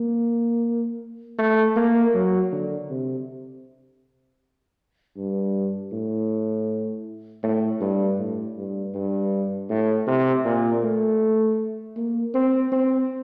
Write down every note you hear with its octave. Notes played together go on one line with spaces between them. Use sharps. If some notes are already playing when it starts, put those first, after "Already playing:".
Already playing: A#3
A3
A#3
F#3
D3
C3
G2
A2
A2
G2
A2
G2
G2
A2
C3
A#2
A3
A#3
C4
C4